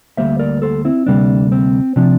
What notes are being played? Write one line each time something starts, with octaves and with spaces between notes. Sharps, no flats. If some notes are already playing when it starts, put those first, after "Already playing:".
D2 C3 G3 A#3 C5 E5
A#4 D5
A4 C5
C4 E4
D2 C3 G3 A#3 D4
C4
C3 F3 D4